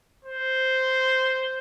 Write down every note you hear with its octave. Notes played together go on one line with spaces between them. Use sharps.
C5